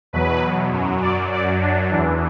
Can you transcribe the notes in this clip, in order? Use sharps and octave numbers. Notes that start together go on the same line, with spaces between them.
E2 B2 F#3 B4
F#2 F#3
D5
F#2 F#3 D5
D4
E3 D4
E2